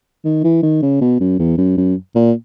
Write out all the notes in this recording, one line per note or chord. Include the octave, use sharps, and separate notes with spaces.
D#3
E3
D#3
C#3
B2
F#2
E2
F#2
F#2
A#2